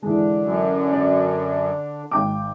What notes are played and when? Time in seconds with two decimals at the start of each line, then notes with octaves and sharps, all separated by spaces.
0.03 D3 E3 G#3 D4
0.41 F#2
0.92 D5
2.11 G#1 G5 D6